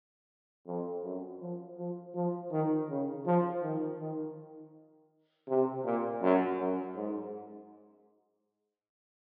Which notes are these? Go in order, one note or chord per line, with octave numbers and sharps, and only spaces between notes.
F2
F#2
F3
F3
F3
D#3
C#3
F3
D#3
D#3
C3
A#2
F#2
F#2
G#2